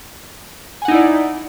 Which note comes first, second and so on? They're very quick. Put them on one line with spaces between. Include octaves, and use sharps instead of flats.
G#5 F#5 D#4 E4 D5